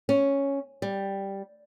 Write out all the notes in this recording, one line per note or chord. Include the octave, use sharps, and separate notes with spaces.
C#4
G3